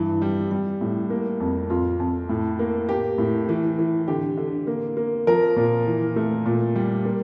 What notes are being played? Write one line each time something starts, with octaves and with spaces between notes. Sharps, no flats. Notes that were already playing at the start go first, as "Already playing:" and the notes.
Already playing: G2 E3
G3
G3
A2
A#3
F2
F2 F4
F2
A2
A#3
A#3 G4
A2
E3
E3
D3 G4
D3
A#3
A#3
F3 A#4
A#2
E3
A3
A#2
G3
A#3